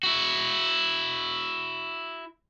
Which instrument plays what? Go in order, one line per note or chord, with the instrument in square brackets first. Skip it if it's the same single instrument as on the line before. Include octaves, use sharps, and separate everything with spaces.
[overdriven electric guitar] E4 F#4